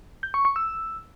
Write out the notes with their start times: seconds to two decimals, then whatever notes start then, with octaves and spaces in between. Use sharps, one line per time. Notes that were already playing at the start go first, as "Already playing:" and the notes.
0.23 G6
0.34 C#6
0.45 C#6
0.56 E6